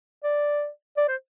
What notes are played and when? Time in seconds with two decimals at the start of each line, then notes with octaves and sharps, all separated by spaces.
0.24 D5
0.97 D5
1.08 C5